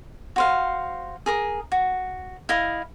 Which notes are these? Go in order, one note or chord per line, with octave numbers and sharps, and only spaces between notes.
F#4 C5 F5
G#4 A#4 D#6
F#4
E4 D#5 F5 D#6